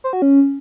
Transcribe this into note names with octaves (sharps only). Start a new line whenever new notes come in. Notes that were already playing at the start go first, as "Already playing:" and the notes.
C5
F#4
C#4